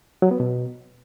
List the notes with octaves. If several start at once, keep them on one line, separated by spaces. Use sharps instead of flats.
F#3
B3
B2